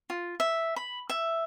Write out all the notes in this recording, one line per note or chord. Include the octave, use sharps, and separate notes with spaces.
F4
E5
B5
E5